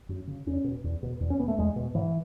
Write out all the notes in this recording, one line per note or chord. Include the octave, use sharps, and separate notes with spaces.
F#2
C#3
E2 C#4
B2
E2
B2
E2
C#4
B2 B3
A3
E2 G#3
B2
G#2 E3